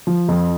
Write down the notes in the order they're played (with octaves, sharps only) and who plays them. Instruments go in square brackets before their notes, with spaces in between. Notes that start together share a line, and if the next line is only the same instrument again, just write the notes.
[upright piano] F3
F2